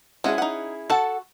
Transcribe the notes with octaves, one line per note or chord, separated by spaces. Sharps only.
G#3 C#4 E4 F#4 G#4
D#4 F#5
F#4 A4 F#5 A5